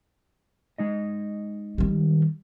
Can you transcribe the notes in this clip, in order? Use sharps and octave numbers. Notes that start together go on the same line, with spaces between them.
G#3 D#4 D#5
D#3 G3